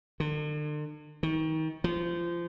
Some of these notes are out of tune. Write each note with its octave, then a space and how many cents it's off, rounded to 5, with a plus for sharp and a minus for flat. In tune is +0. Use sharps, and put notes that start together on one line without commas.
D3 +40
D#3 +30
F3 -25